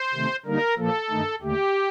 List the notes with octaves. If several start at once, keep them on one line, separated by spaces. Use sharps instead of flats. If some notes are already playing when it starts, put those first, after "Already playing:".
Already playing: C5
C3 D#3 A3 C4
D3 G3 A#3 D#4 A#4
A#2 F3 A#3 A4
G2 D#3 A3 D#4
D#2 D3 A3 G4